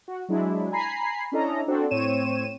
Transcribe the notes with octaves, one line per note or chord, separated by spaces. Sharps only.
F#4
F#3 G#3 D4 E4
G#5 A#5 B5 C7
C#4 D4 E4 A4 D#5 A#5
C4 D4 F#4 A4
A2 C4 C#5 D#7 E7